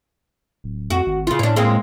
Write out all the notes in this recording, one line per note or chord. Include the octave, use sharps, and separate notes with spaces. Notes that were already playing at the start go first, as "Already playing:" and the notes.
D1
F2 F#4
G#1
C#3 F4
A2 C#4 D4
G#3 A#3 C4